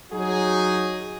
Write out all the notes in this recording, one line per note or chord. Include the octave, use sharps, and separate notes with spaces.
F#3 D#4 F#4 G#4